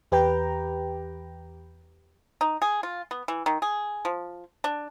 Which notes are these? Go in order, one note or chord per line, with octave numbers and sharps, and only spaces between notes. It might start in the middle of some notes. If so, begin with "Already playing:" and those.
E2 G4 B4 G5 A#5
D#4
G#4
F4
B3
E3
D#3
G#4
F3
D4